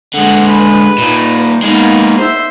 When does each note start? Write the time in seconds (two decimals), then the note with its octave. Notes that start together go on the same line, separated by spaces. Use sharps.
0.14 D3 G#3 F#5
0.48 B4
0.98 A#2 D#4
1.62 G#3 A#3 B3 D#4
2.18 C5 E5